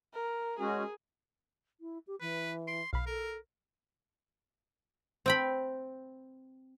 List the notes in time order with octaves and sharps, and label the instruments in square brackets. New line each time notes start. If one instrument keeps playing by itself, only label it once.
[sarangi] A#4
[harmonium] G#3 C#4 F#4 [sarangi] G#4
[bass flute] E4
G4
[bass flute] E3 [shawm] B4
[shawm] C6 [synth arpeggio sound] D7
[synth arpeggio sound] B1 B5 [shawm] F5
[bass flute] A4 [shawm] A#4
[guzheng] C4 G5 B5